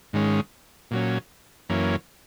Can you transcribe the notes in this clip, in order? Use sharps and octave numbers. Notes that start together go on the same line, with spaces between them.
G#2 D#3 G#3 C#4
A#2 F#3 C#4
F#2 E3 A#3 C#4